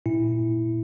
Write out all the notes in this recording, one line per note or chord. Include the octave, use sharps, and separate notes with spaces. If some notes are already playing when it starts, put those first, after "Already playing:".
A#2 E4